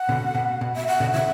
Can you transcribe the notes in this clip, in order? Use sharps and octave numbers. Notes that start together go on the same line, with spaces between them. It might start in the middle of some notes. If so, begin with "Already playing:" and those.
Already playing: F#5
B2 D3
B2
B2
E5
F#5
B2 D3
C#3 E3 E5